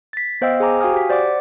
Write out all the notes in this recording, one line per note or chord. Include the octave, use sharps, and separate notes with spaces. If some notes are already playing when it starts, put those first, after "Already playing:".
A6 B6
B3 C5 D#5 F5 G5 E6
G#4 C5 G#5 A#5 D6
F#4 F5 G5 G#5 D#6 F6
G4 B6
C5 D5 F#5 D6